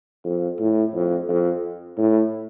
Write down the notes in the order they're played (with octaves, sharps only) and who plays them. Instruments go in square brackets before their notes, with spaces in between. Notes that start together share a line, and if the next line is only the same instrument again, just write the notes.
[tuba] F2
A2
F2
F2
A2